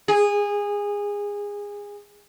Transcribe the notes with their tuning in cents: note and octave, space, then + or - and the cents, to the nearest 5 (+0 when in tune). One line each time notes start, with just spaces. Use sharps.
G#4 -20